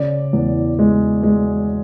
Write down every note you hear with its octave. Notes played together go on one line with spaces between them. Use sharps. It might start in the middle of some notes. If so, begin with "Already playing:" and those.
Already playing: C#3 D5
E2
G#3
G#3